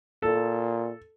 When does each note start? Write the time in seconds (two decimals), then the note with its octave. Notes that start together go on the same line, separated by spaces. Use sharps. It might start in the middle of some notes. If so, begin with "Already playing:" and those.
0.22 A#2 A4